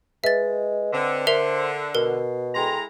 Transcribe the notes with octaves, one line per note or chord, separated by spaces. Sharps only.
G#3 B4 D#5 E5 A6
D3 C4
A#4 C5 E5 C7 F7
B2 A#4
G#3 E4 A4 G5 A#5 C6